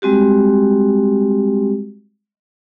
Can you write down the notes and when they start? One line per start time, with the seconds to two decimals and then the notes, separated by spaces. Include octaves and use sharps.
0.02 G3 G#3 C4 F#4 G4